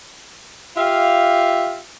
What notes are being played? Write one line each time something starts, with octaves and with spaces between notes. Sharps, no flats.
F4 G4 E5 F5